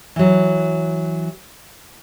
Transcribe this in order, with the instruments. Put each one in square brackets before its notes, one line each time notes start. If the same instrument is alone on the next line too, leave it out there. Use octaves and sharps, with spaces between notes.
[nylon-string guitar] E3 F#3